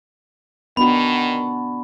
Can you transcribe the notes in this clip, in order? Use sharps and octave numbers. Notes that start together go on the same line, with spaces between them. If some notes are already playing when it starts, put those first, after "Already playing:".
D#3 B3 D4 F#4 B5